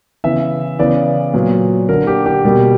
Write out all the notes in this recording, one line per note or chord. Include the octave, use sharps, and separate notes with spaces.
C#3 E3 B3 E5
C#3 E3 B3 D5
A#2 F#3 B3
D3 A#3 A#4
G4
G4
B2 G3 A#3